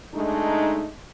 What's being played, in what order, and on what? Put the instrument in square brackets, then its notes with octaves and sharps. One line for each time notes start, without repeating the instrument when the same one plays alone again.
[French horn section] G#3 A3 D4 D#4